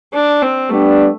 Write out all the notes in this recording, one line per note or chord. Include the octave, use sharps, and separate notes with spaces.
D4
C4
G3 A3 B3 D4 G4